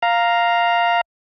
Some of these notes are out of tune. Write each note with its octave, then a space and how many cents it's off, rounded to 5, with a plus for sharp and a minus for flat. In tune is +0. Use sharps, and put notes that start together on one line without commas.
F5 +0 A#5 +0